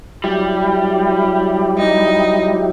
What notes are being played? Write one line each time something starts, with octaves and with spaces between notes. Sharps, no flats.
F#3 G3 E4 G4
D#4